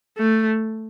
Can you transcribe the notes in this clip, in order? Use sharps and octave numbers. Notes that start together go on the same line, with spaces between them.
A3